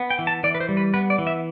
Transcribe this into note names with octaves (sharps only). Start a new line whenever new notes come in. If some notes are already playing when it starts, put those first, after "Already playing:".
Already playing: B3
G5
E3
A5
E3 D5
B4
C5
G3
B4
B3 B4
D5
E3
E5